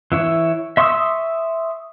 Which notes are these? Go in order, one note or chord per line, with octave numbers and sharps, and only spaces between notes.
E3 E4 C#5
E5 C6 C#6 D#6 E6